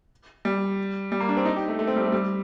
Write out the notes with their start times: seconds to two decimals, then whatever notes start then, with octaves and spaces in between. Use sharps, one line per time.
0.45 G3
1.12 G3
1.20 A#3
1.29 D4
1.37 C4
1.45 D#4
1.56 G4
1.68 A3
1.79 A3
1.87 C4
1.96 G3
2.05 A3
2.12 G3